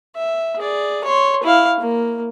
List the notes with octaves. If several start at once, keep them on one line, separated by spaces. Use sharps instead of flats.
E5
G#4 D5
C#5 C6
E4 F5
A#3